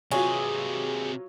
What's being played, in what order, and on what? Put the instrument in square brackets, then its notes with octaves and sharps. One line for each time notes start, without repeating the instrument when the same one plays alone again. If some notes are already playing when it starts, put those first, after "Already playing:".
[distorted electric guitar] C3 B4 [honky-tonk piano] F#3 F4 C#5 [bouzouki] G#4